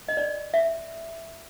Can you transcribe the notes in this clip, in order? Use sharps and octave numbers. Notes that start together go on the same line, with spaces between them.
D#5
D5
E5